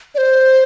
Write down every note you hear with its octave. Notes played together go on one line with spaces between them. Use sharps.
D5
C5